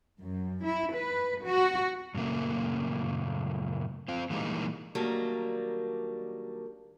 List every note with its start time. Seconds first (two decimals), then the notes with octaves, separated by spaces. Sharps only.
0.19 F#2
0.65 E4
0.94 B4
1.44 F#4
2.15 F#2 A#2 C#3 A3 A#3
4.08 C4 F4
4.30 A#2 E3 G3 G#3 A#3 D#4
4.95 D#3 F#3 G3 A3 A#3 D4